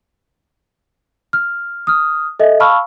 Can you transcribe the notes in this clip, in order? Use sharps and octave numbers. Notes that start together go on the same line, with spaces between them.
F6
D#6 F6
A4 D#5 E5
F5 A5 B5 C#6 E6 F6